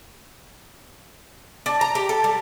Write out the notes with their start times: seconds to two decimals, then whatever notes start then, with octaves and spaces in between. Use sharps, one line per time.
1.66 D4
1.81 A#5
1.95 G4
2.09 A4
2.24 G3